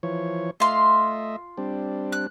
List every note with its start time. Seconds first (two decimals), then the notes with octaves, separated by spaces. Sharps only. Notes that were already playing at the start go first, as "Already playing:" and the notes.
0.03 E3 F3 C#5
0.60 A3 F4 D#5 E5 C6
1.57 G3 C4 D4
2.12 F#6